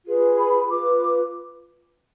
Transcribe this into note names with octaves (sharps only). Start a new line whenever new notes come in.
F4 G#4 B4
B5
F4 B4 D6